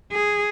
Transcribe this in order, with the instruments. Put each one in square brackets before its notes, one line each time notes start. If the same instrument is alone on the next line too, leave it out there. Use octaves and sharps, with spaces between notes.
[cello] G#4